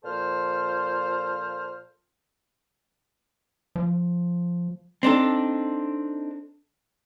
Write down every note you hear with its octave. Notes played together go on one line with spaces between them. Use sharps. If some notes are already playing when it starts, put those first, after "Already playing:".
A#2 F3 A4 C5 F6
F3
C4 D4 D#4 A4